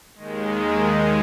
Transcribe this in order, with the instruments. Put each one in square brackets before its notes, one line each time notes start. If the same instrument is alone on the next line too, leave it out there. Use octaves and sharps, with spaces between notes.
[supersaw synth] D#2 D#3 G#3